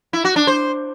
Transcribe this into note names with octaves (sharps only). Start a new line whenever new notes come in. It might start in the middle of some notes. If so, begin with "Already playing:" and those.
E4
F#4
D4
C5